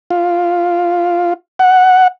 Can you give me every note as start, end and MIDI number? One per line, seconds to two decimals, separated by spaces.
0.11 1.33 65
1.59 2.08 78